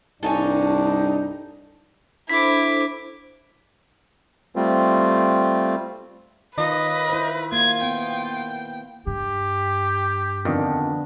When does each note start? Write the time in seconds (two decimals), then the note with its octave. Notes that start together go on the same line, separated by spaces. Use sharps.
0.23 C2 G2 D4 D#4 A4 C#5 G#5
2.29 D4 E4 A4 C5 D6 B6
4.56 G3 A3 C4 F4
6.58 D#3 F4 B4 D#5
7.09 E4 C5
7.52 A#3 F4 G#6
7.83 B3 G5
9.07 G2 G4
10.45 F2 D3 D#3 B3 D4